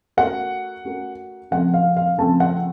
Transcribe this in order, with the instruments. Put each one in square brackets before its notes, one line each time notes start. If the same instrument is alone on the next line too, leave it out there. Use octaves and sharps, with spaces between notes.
[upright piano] A3 C#4 F#4 A#4 [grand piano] F#5
[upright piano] A3 C#4 F#4 A#4
[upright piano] C#3 F3 A3 C4 [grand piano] F#5
[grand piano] F5
F5
[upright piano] C#3 F3 A3 C4 [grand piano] A5
[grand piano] F#5